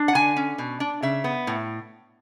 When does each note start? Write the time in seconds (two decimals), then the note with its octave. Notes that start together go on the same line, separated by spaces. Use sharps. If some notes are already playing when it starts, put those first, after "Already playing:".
Already playing: D4
0.08 F#5
0.15 D3 G#5
0.37 C#4
0.58 B2
0.80 D4
1.02 C#3 E5
1.24 B3
1.47 A2